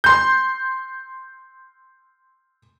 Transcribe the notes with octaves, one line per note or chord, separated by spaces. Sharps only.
C6 G6